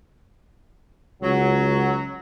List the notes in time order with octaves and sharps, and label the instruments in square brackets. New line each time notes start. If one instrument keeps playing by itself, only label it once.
[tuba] C#2 [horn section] F#3